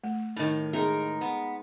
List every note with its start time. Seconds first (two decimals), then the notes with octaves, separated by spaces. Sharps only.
0.04 A3
0.36 A2 D#3
0.73 G#3 D#4 G#4 A#4 E5
1.21 B3